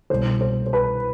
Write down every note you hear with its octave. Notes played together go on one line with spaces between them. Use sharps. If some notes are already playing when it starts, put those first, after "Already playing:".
C2 B2 C5
C5
C5
B4